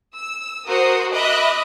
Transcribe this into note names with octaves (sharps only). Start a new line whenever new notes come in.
E6
F#4 A#4 C5 F#5 D#6
D#5 E5 B5 D6 F#6